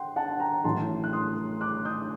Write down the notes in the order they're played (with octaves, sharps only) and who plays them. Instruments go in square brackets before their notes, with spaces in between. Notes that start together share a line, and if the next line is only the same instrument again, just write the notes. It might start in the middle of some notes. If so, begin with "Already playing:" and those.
Already playing: [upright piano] F#5 G5 C6
F#5 A5
G5 A#5
A1 A2 F#3 A5 C6
F#6
C6 D#6
D6 F#6
D#6 G6